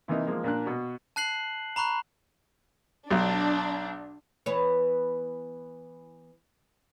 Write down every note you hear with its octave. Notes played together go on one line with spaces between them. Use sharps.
C3 E3 A#3 D#4
F3 G#3 A#3
A#2 A#3 D4 F#6
B2 F#4
A5 F#6 C7 F#7
A#5 B5 C#6 F#6
B1 D4
E3 B3 C#5